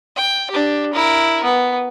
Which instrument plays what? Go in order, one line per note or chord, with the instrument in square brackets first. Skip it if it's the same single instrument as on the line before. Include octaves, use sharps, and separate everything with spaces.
[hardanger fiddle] G5
D4 G4
E4 A#4
B3